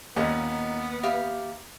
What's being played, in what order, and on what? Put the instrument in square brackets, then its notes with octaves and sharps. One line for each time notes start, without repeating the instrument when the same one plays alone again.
[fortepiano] D#2 [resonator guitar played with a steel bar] A#2 C#4 D#4 [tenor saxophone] B3
[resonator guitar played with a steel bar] G4 E5 F5